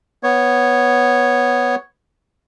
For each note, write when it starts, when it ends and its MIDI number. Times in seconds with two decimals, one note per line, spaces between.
0.23 1.75 59
0.23 1.75 73